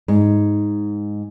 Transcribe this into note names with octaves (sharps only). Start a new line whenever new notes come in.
G#2